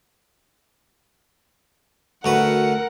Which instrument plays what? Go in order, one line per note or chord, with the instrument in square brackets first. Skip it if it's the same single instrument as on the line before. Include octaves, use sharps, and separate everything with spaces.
[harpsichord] D2 F#4 B4 [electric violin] A#4 F#5